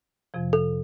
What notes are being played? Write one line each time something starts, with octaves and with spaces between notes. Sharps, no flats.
F2 C3 F3
A4